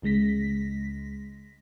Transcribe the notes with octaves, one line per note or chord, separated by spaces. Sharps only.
C#2 C#3 G#3 A#6 B6